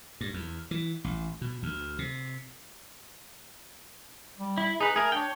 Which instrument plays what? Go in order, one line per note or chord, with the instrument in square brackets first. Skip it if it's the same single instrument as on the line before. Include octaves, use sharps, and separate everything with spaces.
[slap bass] G2
E2
E3
A1
B2
D2
C3
[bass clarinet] G3
[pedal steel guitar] E4
[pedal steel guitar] D#4 B4 [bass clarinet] G#4
[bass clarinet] A3 [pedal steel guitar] G#4 A#4
[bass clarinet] D4 [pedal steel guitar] C#5 G5